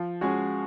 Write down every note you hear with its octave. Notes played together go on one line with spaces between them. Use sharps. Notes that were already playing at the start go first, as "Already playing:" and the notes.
Already playing: F3
G#3 C#4 F#4